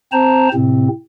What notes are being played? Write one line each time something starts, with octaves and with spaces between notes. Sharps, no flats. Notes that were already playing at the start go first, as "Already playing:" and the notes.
C4 C5 A5 A#5
A2 C3 C4